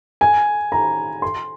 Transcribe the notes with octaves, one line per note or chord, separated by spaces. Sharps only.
G#5
A#5
C6